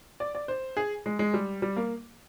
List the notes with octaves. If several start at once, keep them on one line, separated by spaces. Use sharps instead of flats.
D5
D5
C5
G#4
G#3
G#3
G3
G3
A#3